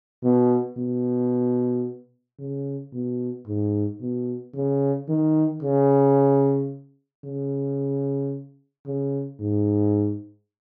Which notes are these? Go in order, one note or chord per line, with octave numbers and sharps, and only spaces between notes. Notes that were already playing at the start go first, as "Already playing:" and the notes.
B2
B2
C#3
B2
G#2
B2
C#3
D#3
C#3
C#3
C#3
G#2